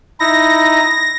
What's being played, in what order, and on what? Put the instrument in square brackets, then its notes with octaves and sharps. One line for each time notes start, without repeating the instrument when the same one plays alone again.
[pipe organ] D#4 E4 [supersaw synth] A#6